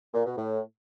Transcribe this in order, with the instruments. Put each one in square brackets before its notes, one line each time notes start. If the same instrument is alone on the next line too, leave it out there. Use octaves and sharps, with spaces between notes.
[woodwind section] A#2
B2
A2